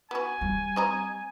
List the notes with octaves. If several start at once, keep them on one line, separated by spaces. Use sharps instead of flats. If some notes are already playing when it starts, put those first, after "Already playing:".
B3 F#4 G#5
G3
C4 D#5 A#5